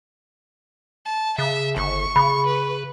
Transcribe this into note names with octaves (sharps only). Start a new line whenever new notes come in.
A5
C#3 E5
G1 C#6
C#3 B5
B4